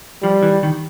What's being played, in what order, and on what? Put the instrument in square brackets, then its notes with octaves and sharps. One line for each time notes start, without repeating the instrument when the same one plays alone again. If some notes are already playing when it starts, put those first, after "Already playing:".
[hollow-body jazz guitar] F3 [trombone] G3
[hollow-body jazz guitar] E3
D#3